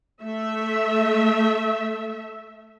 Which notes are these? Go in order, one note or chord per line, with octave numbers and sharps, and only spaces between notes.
A3 E5